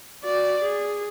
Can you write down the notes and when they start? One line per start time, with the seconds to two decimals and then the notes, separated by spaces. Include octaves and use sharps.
0.24 F#4 D5
0.63 G#4